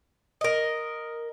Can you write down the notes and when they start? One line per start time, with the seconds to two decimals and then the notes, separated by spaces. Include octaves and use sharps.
0.41 A#4 D#5